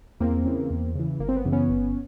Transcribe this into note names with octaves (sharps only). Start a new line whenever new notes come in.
E2 A#3 C4
C#3 E3
E2
C#3 E3
G1 A#3
C4
B3
F#2 C#3 E3
B3 C#4
G1